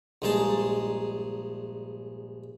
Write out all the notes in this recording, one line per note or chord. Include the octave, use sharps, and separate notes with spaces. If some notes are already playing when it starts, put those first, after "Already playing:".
A#1 G2 G#3 D#4 G#4 A5